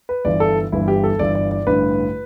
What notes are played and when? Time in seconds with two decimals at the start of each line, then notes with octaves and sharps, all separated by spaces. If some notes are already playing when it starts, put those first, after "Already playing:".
0.09 B4
0.25 G1 G2 E3 D5
0.40 A4
0.72 G1 G2 E3 E4
0.88 G4
1.04 A4
1.19 G1 G2 E3 D5
1.35 D5
1.51 D5
1.67 A1 G2 D3 B4